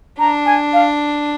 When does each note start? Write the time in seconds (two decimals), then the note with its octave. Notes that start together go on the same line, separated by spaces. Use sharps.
0.19 D4 A#5
0.46 G#5
0.73 F5